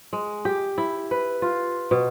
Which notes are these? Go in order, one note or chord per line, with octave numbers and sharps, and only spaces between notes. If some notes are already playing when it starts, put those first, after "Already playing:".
G#3
G4
E4
B4
F4
B2